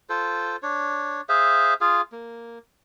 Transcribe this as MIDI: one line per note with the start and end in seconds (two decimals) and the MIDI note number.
0.09 0.56 65
0.09 0.56 69
0.09 0.56 72
0.63 1.21 62
0.63 1.21 73
1.29 1.74 68
1.29 1.74 72
1.29 1.74 76
1.29 1.74 77
1.81 2.01 65
1.81 2.01 68
1.81 2.01 77
2.12 2.58 58